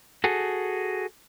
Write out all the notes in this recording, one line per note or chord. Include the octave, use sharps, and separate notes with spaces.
F#4 G#4 A4